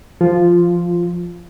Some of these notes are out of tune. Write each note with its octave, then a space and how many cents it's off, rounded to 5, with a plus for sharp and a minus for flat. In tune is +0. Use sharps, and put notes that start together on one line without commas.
F3 -10 F4 +0